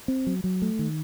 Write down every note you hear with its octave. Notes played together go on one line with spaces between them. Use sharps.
C4
F#3
F#3
A3
D#3